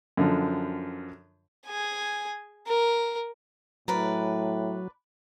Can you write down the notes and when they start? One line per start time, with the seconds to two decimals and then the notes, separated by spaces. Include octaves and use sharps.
0.17 F#2 D3 F3
1.66 G#4 G#5
2.67 A#4
3.88 A2 F#3 A#4 B4 D5